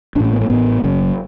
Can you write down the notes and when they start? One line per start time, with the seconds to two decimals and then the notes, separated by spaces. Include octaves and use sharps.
0.15 A1 D4
0.20 A2 C#4
0.33 B3
0.41 A3
0.50 A1 A2 B3
0.84 F#1 F#2 C#3